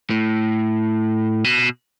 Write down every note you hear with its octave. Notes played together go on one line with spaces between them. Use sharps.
A2
B2